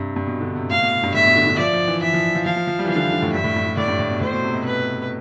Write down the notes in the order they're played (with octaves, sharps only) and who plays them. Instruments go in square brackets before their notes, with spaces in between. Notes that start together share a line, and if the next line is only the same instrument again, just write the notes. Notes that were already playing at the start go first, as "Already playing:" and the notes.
Already playing: [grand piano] G2 C3
G2
B2
D3
C3
[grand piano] A2 [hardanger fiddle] F5
[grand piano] B2
B2
G2
[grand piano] A2 [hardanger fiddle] E5
[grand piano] B2
D3
D3
[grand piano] F3 [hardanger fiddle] D5
[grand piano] F3
E3
[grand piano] E3 [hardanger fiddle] E5
[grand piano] F3
F3
[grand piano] F3 [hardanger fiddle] F5
[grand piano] F3
F3
G3
E3
[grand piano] F3 [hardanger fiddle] F5
[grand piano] D3
E3
D3
A2
[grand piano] G2 [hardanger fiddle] E5
[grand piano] A2
G2
G2
[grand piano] A2 [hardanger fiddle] D5
[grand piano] G2
A2
B2
[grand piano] A2 [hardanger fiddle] C5
[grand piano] B2
C3
B2
[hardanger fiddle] B4